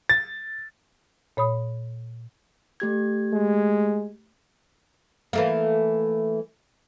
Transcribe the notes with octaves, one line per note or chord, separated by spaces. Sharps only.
A6
A#2 C#5 B5 D#6
A3 G4 G#6
G#3
E3 A3 A#3